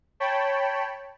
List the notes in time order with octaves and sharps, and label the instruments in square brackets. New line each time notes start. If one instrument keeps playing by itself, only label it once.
[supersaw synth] C#5 G5 A5 B5